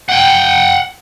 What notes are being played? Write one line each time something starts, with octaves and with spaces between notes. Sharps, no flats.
F#5 G5